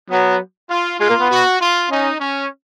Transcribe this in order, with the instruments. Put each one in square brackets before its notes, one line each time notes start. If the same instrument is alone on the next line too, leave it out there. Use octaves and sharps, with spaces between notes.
[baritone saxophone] F#3 [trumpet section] B3
[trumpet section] F4
[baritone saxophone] G#3 [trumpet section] F4
[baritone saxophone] A#3
B3
[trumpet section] F#4
F4
[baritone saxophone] C#4 [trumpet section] D#4
[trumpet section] C#4